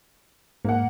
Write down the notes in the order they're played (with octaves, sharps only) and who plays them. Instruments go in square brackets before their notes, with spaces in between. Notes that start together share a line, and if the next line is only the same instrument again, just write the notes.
[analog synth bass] G#2 [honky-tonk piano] A#3 F#5